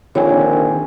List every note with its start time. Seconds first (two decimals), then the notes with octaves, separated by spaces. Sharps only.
0.15 A#1 D3 D#3 C4 F4 C#5 G#5